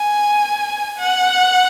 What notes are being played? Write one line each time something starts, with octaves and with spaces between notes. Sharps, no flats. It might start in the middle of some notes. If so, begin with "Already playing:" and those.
Already playing: G#5
F#5